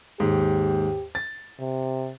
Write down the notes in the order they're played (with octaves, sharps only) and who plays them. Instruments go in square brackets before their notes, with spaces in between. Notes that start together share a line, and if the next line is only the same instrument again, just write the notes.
[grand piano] D#2 G#2 [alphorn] G4
[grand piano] A6
[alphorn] C3